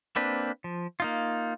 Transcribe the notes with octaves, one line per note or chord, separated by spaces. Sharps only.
A#3 C4 D4 B4
F3
A#3 D#4 F4